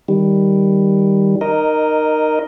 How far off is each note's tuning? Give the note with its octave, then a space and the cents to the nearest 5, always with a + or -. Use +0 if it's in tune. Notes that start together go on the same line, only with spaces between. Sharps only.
D#3 +0 G3 +0
D#4 -20 A#4 +0 D#5 +0